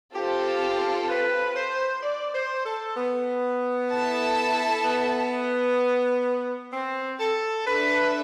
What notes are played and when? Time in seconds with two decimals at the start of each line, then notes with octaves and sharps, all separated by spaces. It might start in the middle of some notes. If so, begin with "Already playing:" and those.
0.15 C4 F4 G4 A4
1.09 B4
1.56 C5
2.03 D5
2.34 C5
2.65 A4
2.97 B3
3.91 E4 A4 E5 A5
4.85 B3
6.73 C4
7.20 A4
7.66 D4 A4 B4 E5